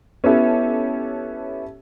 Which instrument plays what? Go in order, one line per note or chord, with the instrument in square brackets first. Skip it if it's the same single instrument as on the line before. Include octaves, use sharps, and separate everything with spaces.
[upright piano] B3 E4 [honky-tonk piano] C#4 G4 A4